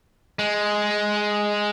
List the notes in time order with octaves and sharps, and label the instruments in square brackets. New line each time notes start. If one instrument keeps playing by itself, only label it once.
[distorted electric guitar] G#3